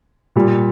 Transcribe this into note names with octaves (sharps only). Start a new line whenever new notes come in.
A#2 G3